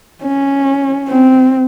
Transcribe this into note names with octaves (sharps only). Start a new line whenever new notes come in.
C#4
C4